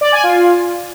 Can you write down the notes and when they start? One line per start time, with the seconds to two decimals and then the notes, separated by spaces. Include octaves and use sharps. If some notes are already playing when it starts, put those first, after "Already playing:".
0.01 D5
0.12 G#5
0.23 F4